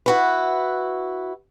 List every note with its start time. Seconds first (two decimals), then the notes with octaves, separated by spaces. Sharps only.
0.06 E4 F#4 B4